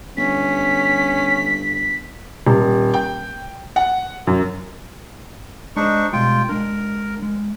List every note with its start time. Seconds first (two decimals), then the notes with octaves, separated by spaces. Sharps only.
0.17 G1 C#4 B6
2.47 D#1
2.94 G5
3.76 F#5
4.27 F#2
5.76 G#3 D4 D#4 G#4 C5 C#6
6.13 B2 G3 G#3 F4 G5
6.49 G#3 D4 A#4
7.22 G#3